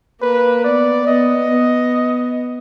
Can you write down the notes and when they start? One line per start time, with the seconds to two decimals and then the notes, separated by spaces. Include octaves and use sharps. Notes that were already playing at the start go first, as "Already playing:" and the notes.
0.22 A#3 B4
0.64 B3 D5
1.07 B3 D#5
1.50 B3